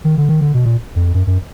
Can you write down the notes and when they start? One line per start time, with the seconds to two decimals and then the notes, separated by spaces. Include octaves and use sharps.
0.05 D#3
0.18 D3
0.29 D#3
0.41 D3
0.54 B2
0.66 A#2
0.96 F2
1.14 F#2
1.27 F#2